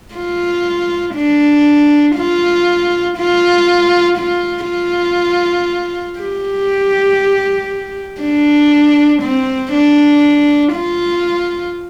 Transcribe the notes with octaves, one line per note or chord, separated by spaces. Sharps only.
F4
D4
F4
F4
F4
F4
G4
D4
C4
D4
F4